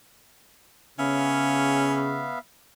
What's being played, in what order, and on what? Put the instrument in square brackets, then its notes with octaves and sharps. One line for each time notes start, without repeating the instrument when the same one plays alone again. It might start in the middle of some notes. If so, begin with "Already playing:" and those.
[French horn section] C#3 [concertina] B3 E5 F5 [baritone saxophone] C#4